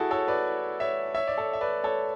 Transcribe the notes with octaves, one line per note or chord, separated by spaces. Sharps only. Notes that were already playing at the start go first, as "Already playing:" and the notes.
Already playing: E4 F#4 G#4 A4
A4 C#5
B4 D5
C#5 E5
C#5 E5
D5
A4 C#5
E5
B4 D5
A4 C#5